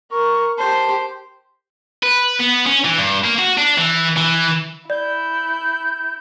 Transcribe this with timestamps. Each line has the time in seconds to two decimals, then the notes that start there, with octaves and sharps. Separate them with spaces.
0.11 A#4 C#6
0.58 G4 C5 A5
2.03 B4
2.39 B3
2.67 C#4
2.85 E3
2.97 G2
3.24 A#3
3.39 F#4
3.58 D4
3.78 E3
4.17 E3
4.90 E4 D5 G6